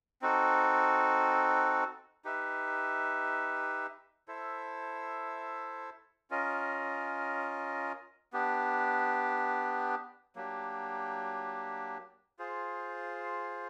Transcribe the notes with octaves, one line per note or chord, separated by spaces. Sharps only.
C4 D#4 F#4 A4
D#4 G4 B4 E5
E4 A4 C5 E5
C#4 F4 A#4 D#5
B3 D4 G4
F#3 A#3 D4 G4
F4 G#4 C5